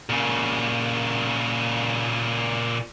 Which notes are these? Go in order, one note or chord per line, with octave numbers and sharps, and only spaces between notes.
A#2 C#3